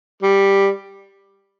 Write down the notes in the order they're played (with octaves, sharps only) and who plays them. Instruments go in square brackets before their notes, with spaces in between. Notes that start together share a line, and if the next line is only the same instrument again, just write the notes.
[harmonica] G3